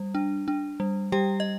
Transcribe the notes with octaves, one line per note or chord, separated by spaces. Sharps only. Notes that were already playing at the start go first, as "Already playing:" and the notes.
Already playing: G3
D4
D4
G3
G3 G4 G5
D#5